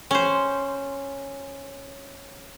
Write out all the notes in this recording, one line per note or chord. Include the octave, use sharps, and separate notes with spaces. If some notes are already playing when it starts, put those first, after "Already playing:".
C#4 C5